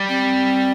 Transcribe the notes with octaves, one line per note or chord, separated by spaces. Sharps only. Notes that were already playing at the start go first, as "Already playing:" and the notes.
Already playing: G3
C4